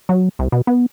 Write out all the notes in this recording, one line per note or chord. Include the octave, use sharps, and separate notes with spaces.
F#3
C2
B2
B3